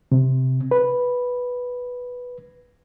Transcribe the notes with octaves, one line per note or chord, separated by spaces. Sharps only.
C3
B4